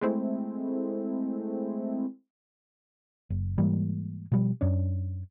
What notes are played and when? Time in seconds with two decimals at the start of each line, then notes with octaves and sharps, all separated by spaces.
0.01 G#3 A3 C4 E4
3.30 F#1
3.58 G#2 E3 G3 A#3
4.32 B2 F3 G3
4.61 F#2 C#4 D4